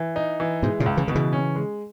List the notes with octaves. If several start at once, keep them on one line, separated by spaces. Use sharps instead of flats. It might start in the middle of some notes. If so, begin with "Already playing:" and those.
Already playing: E3
D#4
E3
G#2 B2 G#3
A#2 C#3
C#2
C#3 E3
B2 D#3
C#3 E3
C#4
G#3